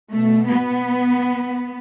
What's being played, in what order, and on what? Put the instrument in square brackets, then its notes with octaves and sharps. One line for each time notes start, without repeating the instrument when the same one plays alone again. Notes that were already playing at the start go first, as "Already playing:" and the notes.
[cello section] B2 A3
B3